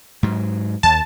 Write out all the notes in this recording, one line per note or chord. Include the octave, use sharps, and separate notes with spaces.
G#2 F#3
D#2 A5